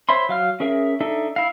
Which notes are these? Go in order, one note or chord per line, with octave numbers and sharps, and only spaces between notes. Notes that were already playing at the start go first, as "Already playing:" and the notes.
C5 C#5 E5 B5 C6
F#3 F5 F6
C#4 G#4 A#4 E5
D4 D#4 A4 E5
E4 F5